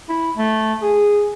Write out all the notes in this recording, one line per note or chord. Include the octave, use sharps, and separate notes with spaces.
E4
A3
G#4